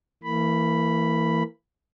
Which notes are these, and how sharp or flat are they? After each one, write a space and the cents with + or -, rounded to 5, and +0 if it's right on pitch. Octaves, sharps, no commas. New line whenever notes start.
E3 +0 A#3 -35 B5 +0